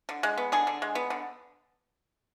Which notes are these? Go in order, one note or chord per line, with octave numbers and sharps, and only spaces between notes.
D3
G#3
B3
D3 G#4
D3
G#3
B3
D3